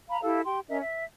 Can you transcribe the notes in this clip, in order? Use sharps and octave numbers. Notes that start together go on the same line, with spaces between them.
F5 A#5 B5
E4 G4 A4 F5
G4 G5 C6
C#4 A#4 D#5 E5
E5